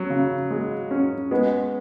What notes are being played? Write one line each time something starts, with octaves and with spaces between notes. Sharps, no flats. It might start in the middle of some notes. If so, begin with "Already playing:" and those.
Already playing: F#3 C#4
C#3
G#3
C#4
G#3 B3